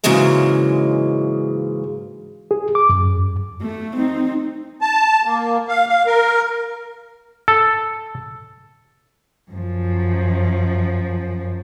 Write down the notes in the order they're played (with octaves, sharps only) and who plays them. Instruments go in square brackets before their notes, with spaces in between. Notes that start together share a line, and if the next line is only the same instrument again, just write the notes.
[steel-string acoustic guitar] G#2 C#3 E3 F#3 G#3 A#3
[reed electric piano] G#4
D6
F#2
[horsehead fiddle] A3
C4 D#4
[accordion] A5
A#3
F5
F5
A#4
[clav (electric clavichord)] A4
[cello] F#2 F3